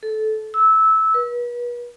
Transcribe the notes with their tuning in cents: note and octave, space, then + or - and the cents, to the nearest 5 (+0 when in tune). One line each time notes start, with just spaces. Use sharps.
A4 -20
E6 -15
B4 -40